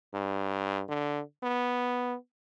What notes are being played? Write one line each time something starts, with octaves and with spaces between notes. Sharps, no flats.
G2
D3
B3